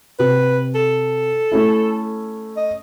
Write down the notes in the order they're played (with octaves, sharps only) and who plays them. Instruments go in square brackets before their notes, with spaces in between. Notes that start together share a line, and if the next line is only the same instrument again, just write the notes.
[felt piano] C3 [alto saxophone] B4
[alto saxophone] A4
[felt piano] A3 C#4 E4
[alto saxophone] D#5